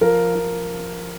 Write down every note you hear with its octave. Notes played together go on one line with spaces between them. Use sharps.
F3 A#4
F3